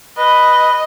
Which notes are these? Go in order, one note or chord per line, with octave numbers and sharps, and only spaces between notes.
B4 D#5